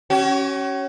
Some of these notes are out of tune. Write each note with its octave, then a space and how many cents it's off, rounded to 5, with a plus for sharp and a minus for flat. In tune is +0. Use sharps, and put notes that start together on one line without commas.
C#4 +0 F#4 +45